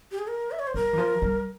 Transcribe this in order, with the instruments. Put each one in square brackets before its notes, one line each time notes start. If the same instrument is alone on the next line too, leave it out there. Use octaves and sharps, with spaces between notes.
[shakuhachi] G4
G#4
A#4
E5
C#5
C5
[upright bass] G3 [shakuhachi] A#4
[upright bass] E3
F3
G3